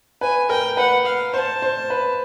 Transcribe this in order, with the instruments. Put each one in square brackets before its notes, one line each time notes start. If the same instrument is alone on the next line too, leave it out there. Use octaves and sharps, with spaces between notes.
[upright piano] B4 [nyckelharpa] G#5
[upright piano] A#4 [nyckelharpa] G5
[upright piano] B4 [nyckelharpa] F#5
[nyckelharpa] F5
[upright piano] C5 [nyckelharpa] A5
[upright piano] C5
B4